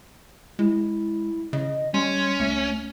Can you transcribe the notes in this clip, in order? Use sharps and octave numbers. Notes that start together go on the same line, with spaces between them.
G#3 E4
C#3 D#5
G3 C#4 C6
C#2 A3